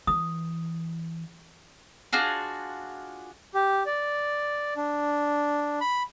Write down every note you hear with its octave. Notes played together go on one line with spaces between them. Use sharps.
E3 D#6
D4 F4 F#4 G#4
G4
D5
D4
B5